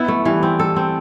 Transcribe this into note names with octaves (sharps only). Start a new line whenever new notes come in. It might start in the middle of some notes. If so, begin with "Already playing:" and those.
Already playing: B3 E4
A3
E3 G3
C4
G3 A4
C4